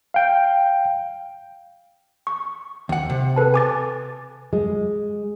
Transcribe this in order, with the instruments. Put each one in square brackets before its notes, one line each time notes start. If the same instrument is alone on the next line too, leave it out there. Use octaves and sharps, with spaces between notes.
[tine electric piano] F5 G5
[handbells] C#6
[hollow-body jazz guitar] D#2 F#5
C3
[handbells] A4 B4 A5
G#5 D6 A6
[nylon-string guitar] G#3